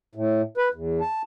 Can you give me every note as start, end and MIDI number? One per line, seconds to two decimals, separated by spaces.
0.15 0.42 45
0.58 0.69 71
0.74 1.01 40
1.01 1.22 81